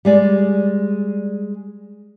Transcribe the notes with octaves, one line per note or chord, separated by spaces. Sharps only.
G3 G#3 D5